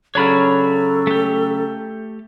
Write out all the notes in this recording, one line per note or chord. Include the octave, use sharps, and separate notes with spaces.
C#3 F#3 D4 A4 C#5 B5 F6
A3 G4